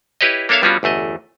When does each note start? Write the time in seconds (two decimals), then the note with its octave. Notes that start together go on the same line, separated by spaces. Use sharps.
0.21 E4 G4 B4 C#5 D#5
0.49 A#3 D4 A4 C#5 E5 F5
0.62 G2 G3 B3 C#4 F4 F#4
0.83 G1 E2 A3 D#5